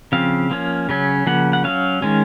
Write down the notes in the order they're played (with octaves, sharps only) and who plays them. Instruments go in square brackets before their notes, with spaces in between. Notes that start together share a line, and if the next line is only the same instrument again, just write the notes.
[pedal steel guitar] C#3 F3 C4 F5
F3 A#3 C#4
C#3 F#3 C#4
C#3 F3 A#3 F#5
F#5
F#3 C#4 F5
D#3 G#3 C#4